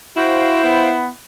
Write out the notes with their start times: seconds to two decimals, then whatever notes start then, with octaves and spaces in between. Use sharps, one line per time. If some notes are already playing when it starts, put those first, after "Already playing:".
0.17 E4 F#4 C5 F5 G5
0.64 B3